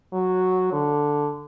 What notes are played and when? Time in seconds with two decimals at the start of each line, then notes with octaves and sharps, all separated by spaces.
0.13 F#3
0.72 D3